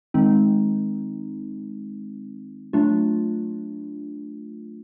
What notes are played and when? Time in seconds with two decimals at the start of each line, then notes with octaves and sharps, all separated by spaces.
0.14 D#3 G#3 C4 D#4
2.73 F#3 A3 D4 F4